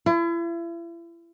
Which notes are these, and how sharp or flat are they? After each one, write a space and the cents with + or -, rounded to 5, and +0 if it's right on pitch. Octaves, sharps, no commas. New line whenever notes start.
E4 +40